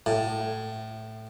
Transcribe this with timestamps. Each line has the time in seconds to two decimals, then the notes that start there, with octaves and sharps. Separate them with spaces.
0.06 A2